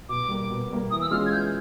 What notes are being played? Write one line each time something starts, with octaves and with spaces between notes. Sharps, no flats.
B2 D6
G3 A#3
B2
G3 A#3
E3 D#6
E6
G#3 C#4 F4 G#4 F6
G#6
E3 G6